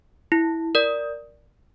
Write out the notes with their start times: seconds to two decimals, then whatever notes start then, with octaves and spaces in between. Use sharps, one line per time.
0.32 E4
0.75 A#4 D5